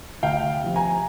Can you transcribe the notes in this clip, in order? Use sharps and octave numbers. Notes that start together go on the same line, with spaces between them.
D2 F5 G5
C3 F3
G#5 A#5